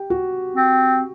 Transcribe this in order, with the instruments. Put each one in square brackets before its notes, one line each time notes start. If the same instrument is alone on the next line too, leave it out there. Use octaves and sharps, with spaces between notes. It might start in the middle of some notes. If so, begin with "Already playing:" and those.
Already playing: [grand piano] G4
F#4
[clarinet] C4